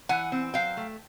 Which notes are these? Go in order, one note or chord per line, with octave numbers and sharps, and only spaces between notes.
E3 F#5 G#5
C4
F#3 F5 G5
A3